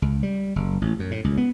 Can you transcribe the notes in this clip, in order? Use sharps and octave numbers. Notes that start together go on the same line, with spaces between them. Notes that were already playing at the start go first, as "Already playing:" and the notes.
C#2
G3
F#1
A1
F#2
A2
C#2
B3